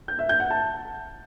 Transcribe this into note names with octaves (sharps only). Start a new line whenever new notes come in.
G6
E5
G6
F#5
A5